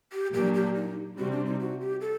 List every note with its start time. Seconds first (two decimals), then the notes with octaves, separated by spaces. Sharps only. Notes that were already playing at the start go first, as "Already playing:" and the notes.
0.13 G4
0.33 A#2 F#3 A#3 D4 G4
0.54 G4
0.75 D#4
1.17 C3 G3 C4 F#4
1.32 D4
1.46 D#4
1.60 F#4
1.81 G4
2.01 A4